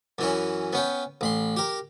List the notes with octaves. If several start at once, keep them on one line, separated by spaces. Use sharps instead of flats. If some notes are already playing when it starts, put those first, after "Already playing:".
F#2 E3 C#4
B3 C#4 G5
A1 B5 C6
G4 A#4